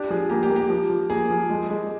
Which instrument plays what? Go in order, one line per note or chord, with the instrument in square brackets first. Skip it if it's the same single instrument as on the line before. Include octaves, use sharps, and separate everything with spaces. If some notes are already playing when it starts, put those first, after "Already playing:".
Already playing: [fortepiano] D4 [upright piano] G4
[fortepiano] F3 [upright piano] G#4
[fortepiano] A#3 [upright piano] G4
[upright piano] G4
[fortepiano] A#3
[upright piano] G4
[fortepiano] F3
F3
[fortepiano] A#3 [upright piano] G#4
[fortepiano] F3
G#3
G#3